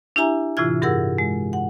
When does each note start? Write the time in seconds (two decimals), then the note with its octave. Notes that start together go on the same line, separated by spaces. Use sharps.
0.16 D4 E4 G4 E5 G#5 A#5
0.57 A2 C3 E3 E4 F4 G#6
0.82 G2 G4 G#4 A#4 F#5 E6
1.18 G#3
1.53 F#5